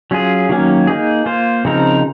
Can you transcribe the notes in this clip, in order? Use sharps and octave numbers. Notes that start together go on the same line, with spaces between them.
F#3 C#4 F4 G#4
D#3 F#3 A#3 C#4
A#3 D#4 G#4
A#3 F4 C5
C#3 F3 C4 D#4 A#4